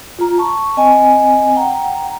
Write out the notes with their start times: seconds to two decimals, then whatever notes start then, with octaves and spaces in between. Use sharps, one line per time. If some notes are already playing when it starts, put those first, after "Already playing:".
0.19 F4 A#5
0.38 A5 C#6
0.77 C4 D#5 G#5
1.56 F#5 G5 A#5